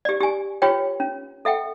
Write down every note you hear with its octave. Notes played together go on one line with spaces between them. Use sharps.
G4 D5
G4 G#5
F4 G4 B4 C#5 G5
C#4
A4 E5 F#5 G5